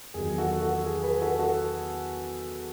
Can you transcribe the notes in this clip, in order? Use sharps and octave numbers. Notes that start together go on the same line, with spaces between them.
E2 D#3 F#3 G#4
F#4 A4
F#4 A4
G#4
G#4 B4
F#4 A4
F#4 A4